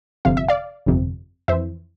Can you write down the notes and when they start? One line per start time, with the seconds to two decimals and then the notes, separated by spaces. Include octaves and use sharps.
0.25 G1 F2 C3 F5
0.37 E5
0.48 D5 F5
0.86 G1 F2 C3
1.48 F2 C5 E5
1.52 E3